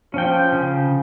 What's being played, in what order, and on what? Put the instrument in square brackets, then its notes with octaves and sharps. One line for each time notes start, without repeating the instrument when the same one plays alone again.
[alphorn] F3 [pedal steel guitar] C#4 G5
[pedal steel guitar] C#3